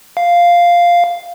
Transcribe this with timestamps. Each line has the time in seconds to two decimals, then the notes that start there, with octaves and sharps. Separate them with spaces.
0.17 F5